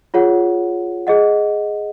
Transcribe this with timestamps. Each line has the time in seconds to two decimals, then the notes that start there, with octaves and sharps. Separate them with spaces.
0.14 F4 G#4 C#5 F#5
1.07 G#4 D#5 F#5